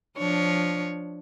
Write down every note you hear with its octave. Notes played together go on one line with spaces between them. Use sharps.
F3 D4 C#5